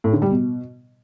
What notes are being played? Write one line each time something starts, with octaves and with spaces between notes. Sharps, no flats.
A2
D3
G3
B2